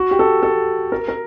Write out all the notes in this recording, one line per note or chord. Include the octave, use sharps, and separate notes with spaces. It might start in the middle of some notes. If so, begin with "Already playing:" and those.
Already playing: F#4
G4
A4
A4
A#4
A#4